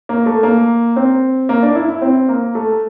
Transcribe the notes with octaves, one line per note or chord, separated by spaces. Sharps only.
A#3
A3
A#3
C4
A#3
D4
E4
E4
C4
A#3
A3